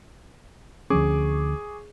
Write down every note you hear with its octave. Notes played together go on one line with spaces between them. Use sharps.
D2 F3 C#4 G#4 C#6 D6